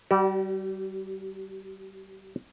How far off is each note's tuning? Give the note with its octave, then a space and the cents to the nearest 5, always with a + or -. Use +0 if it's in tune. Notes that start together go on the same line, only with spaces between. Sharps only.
G3 -25 F#4 +45 D5 +0